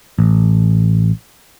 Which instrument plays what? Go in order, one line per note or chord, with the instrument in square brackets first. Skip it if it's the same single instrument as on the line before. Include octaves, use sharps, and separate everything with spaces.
[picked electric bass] A1